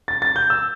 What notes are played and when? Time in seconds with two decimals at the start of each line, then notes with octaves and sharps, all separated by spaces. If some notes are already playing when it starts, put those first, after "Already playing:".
0.08 A6
0.22 A6
0.36 G6
0.50 E6